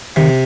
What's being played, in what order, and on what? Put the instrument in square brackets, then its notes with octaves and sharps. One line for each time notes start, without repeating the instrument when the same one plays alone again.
[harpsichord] C3 [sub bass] D#3